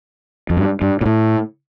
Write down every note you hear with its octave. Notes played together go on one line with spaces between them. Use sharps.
F2
G2
G2
A#2
A2